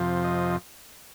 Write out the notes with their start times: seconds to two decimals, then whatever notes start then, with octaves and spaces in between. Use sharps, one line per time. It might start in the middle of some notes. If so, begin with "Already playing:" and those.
Already playing: F2 C3 F3
0.24 D#5